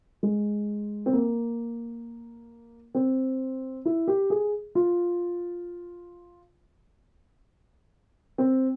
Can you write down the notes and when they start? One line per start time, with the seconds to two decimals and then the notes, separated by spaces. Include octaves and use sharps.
0.23 G#3
1.06 C4
1.13 A#3
2.95 C4
3.85 E4
4.08 G4
4.30 G#4
4.75 F4
8.38 C4